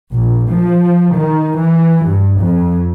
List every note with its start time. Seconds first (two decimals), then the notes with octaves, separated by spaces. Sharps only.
0.12 A#1
0.48 F3
1.13 D#3
1.56 E3
2.04 G2
2.39 F2